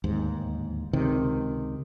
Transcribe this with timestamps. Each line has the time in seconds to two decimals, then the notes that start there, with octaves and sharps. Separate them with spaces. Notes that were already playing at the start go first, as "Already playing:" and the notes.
0.04 D1 D#2 G#2
0.93 C#2 C3 D#3